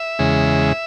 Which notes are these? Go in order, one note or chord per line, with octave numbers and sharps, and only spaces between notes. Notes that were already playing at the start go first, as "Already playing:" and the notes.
Already playing: E5
E2 C#3 G#3